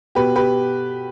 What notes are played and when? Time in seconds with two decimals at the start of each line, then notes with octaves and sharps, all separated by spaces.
0.15 B2 G4 B4
0.35 G4 B4